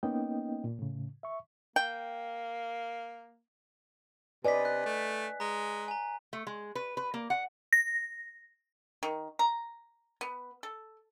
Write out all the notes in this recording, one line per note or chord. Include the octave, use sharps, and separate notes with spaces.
A#3 B3 C#4 D#4 D#5 G5
A#2
A2 C#3
E5 C#6
A#3 G5
C3 B4 D5 D#5 G#5 B6
F#6
A3
G#3 A#5
G#5 A#5
A3
G#3
B4
B4
A#3
F#5
A#6
D#3
A#5
B3
A4